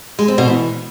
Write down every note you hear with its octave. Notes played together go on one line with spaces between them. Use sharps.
G#3
C4
B2
E3